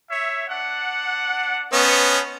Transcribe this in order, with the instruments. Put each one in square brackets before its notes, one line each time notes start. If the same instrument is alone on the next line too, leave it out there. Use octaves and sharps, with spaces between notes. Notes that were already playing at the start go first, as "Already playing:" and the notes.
[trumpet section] C#5 E5
D4 F#5
[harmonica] B3 C#4 [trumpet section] C5 D#5 A5